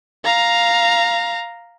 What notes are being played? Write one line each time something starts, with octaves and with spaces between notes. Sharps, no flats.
F5 A#5